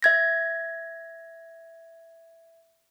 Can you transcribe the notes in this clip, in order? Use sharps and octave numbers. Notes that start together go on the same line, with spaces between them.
E5 G#6 A#6